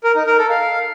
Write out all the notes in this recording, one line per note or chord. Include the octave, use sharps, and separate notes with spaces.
A#4
D#4
A#4
A4
F5